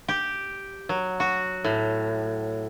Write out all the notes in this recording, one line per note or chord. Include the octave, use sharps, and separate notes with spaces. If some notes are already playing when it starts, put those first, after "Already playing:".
G4
F#3
F#4
A2